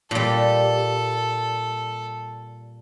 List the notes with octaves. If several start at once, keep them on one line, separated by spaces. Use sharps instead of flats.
A#2 G3 A4